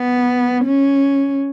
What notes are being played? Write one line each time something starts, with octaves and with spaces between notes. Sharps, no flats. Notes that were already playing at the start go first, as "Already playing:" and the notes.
Already playing: B3
C#4